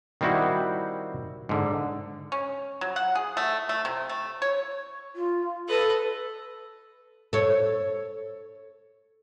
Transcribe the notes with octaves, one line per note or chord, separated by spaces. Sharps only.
D#3 G3 C4 E4 F#4
G#2 D3
C#4
F#3
F#5
G#4
A3
A3
C3
A3
C#5
F4
A4 B4 D#5
A4 C#5